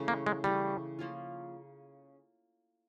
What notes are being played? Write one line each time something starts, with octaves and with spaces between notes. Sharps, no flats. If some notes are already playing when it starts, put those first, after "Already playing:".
Already playing: C#3 E3 A3 C#4
A#3
G#3
C#3 E3 G3 A3 C#4
F3 A#3 C#4 F4